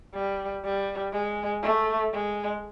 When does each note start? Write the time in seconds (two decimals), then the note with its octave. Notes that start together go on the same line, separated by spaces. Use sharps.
0.14 G3
0.65 G3
1.13 G#3
1.63 A3
2.13 G#3